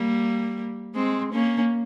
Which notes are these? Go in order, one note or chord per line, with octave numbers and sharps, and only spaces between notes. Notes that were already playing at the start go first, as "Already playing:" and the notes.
Already playing: G3 A#3
G#3 C4
A#3 C#4